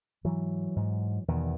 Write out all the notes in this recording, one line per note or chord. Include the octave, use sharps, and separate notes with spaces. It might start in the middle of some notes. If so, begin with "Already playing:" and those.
G#2 E3 F#3
G#2
E2 B2 D#3